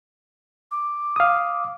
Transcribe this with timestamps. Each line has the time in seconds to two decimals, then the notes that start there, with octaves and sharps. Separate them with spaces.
0.71 D6
1.16 F5 D#6